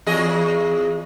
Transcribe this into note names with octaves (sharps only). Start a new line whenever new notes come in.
E2 G#4 D#5